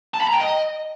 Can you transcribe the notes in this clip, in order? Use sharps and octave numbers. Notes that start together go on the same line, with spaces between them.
A5
B5
A#5
G5
D#5